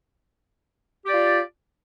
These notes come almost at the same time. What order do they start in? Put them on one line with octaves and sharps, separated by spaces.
G4 D5 F4